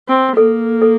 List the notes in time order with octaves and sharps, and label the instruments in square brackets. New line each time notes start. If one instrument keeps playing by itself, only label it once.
[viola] C4
[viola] A#3 [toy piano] A4
[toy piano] A4